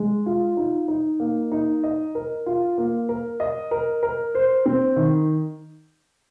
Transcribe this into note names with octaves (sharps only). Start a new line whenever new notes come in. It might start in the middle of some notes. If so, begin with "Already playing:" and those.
Already playing: G#3
F4
D#4
D#4
A#3
D#4
D#5
A#4
F4
A#3
A#4
D#5
A#4
A#4
C5
C4
D#3